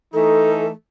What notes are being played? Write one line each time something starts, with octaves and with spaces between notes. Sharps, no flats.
E3 A3 D#4 A4